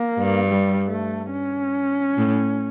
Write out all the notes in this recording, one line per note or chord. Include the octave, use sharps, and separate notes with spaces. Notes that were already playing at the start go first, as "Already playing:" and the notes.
Already playing: A#3
G2
G3
A3
C#4
A2